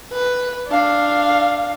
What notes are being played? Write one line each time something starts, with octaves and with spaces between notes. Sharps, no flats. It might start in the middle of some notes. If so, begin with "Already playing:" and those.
B4
D4 F5